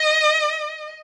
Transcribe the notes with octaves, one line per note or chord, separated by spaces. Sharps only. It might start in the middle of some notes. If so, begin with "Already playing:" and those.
Already playing: D#5